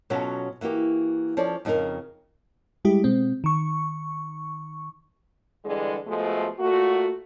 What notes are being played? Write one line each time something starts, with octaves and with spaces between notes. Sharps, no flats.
B2 F#3 C#4 F4 F#4 A4
E3 A#3 F#4 G4
F3 C#4 A4 C#5 D5
F2 C#3 D#4 F4 A#4
G3 G#3 E4 G4
B2 G#3 C4
D#3 C#6
D3 E3 G3 G#3
B2 F3 G#3 A3
A#2 A3 F#4